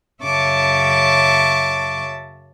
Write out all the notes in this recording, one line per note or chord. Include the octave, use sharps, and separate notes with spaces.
F#2 C#3 E5 A5 C#6 D6